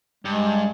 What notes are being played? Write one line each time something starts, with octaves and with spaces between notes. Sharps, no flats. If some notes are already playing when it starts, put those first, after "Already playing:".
G2 G#3